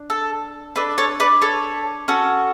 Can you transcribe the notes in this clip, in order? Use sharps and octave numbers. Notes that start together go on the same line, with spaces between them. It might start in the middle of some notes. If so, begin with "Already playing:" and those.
Already playing: D4
A4
D4 A4 B4
A4 C#5
B4 D5
A4 C#5
C#4 F#4 A4